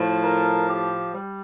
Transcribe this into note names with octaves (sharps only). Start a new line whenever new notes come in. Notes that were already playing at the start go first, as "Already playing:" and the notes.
Already playing: A2 F3
A#4
G4
G3